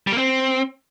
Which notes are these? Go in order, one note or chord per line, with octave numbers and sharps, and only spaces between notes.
G3
A#3
C4